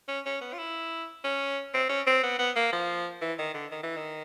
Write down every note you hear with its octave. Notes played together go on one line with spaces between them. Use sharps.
C#4
C#4
B3
F4
E4
C#4
C4
C#4
C4
B3
B3
A#3
F3
E3
D#3
D3
D#3
E3
D#3